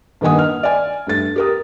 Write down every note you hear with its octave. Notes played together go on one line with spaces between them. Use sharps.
G2 D#3 A#3 F#5 G#5 D#6
F6
D5 G#5
G2 A3 A6
G4 A#4 D#6